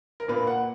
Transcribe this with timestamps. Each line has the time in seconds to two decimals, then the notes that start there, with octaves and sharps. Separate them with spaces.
0.20 A#4
0.28 A#2 A#3 B4
0.47 F#5